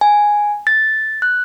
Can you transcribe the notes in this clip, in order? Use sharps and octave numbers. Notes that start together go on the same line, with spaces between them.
G#5
A6
F#6